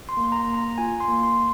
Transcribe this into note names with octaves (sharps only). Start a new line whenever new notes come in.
C6
A#3
C6
A#5
A#3
A#5
F4 G#5
C6
A#3
C6